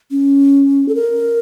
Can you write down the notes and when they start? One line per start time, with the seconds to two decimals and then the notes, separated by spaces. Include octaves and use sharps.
0.11 C#4
0.88 A4
0.95 A#4